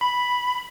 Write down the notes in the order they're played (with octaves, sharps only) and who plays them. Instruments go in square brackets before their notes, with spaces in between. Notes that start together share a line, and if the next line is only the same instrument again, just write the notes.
[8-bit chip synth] B5